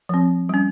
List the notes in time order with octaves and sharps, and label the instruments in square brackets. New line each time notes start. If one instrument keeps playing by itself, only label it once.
[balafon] F3 C4
G3 C#4